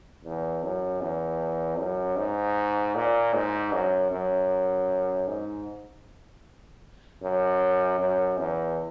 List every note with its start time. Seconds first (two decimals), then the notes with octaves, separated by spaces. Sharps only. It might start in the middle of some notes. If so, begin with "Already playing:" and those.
0.24 E2
0.64 F#2
1.01 E2
1.79 F#2
2.17 G#2
2.95 A#2
3.34 G#2
3.74 F#2
4.11 F#2
5.28 G#2
7.23 F#2
7.99 F#2
8.38 E2